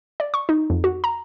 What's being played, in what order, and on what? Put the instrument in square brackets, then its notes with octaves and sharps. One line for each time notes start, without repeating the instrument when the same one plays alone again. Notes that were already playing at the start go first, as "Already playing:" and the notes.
[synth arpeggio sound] D5
C#6
D#4
F2
F#4
A#5